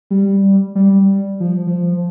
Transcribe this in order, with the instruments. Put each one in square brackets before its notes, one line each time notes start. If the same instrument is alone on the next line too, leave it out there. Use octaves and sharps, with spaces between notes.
[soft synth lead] G3
G3
F3
F3